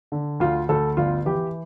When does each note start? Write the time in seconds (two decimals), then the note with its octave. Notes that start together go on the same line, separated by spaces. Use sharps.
0.12 D3
0.40 D2 F4
0.69 D2 A4
0.97 G1 F4
1.26 E3 G4